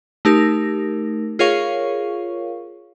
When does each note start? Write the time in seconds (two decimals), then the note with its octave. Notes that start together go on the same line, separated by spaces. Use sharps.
0.25 A3 D#4 G4 A#4 A#6
1.39 F4 G#4 A#4 C#5 F5 C#6